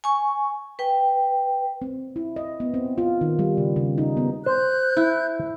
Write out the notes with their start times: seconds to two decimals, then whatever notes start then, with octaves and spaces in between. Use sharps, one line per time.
0.04 G#5 C#6
0.79 B4 G5
1.82 C4
2.16 E4
2.36 D#5
2.60 B3
2.74 C4
2.98 F4
3.21 D#3
3.39 G3
3.58 C#3
3.76 C#3
3.98 D#4
4.17 B3
4.46 C5 F#6 G6
4.97 E4